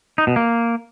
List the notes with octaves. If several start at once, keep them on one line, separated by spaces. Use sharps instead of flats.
D#4
B2
A#3